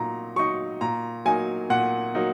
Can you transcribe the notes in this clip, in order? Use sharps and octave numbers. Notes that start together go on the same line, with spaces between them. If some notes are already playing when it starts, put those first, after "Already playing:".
Already playing: A#2 F#3 D#4 A#5
F#3 D#4 C#6
A#2 A#5
F#3 A#3 D#4 G#5
A#2 F#5
F#3 A#3 D#4